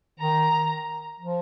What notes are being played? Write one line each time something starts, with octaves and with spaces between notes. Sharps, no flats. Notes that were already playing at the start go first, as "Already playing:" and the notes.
D#3 A#5
F3